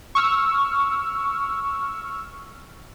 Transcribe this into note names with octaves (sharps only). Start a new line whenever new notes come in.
C#6 E6 F6